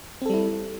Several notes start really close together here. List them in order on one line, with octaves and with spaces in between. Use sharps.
C4 A4 G3 E4